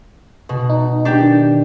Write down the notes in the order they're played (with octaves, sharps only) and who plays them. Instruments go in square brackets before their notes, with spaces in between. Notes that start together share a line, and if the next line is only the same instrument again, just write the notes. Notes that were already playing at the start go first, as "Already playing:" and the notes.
[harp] B2
[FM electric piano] D#4
[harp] D4 G4
[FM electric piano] D#3